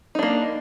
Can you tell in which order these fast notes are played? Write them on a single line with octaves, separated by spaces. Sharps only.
D#4 D4 A#3